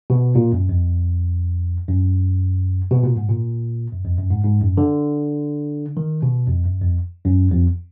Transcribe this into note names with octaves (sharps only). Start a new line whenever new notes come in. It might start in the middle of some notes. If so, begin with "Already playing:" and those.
B2
A#2
F#2
F2
F#2
B2
A#2
G#2
A#2
F#2
F2
F#2
G#2
G#2
F#2
D3
D#3
B2
F2
F#2
F2
F#2
F2